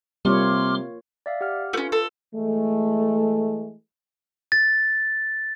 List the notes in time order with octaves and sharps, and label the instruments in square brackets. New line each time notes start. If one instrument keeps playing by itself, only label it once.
[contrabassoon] C3 [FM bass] G3 [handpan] A#3 F4 C#5 [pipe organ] C6 D6 F6
[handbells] D5 E5 F5
G4 F#5 F6
[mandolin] A3 C#4 [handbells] F4 B4
[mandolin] A4
[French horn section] E3 G#3 A3
[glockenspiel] A6